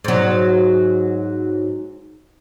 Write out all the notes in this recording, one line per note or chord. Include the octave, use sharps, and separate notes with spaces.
G#2 F#3